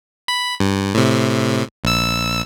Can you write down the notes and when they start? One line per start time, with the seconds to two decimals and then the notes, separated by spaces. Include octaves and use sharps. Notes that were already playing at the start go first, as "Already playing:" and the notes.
0.28 B5
0.60 G2
0.95 A2 C3
1.84 A#1 E6